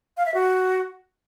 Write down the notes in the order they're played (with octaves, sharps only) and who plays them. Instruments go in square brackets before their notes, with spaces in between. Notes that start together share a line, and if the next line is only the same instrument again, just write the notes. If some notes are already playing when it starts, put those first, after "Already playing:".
[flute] F5
E5
F#4